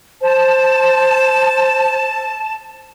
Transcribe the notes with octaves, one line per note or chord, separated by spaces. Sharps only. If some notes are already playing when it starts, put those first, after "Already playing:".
C5 A5